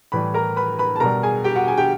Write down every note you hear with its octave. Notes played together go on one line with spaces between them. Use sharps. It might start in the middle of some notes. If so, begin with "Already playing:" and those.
A2 E3 G3 B4 B5
A#4 A#5
B4 B5
B4 B5
A5
B2 G3 A#4 A#5
G#4 G#5
G4 G5
F#4 F#5
G#4 G#5
G4 G5